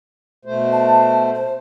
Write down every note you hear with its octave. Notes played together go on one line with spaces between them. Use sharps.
B2 A3 C5
A5
C5